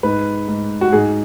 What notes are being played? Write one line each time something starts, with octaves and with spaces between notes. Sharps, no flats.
G#2 B4
G#2
F#4
G#2 G#4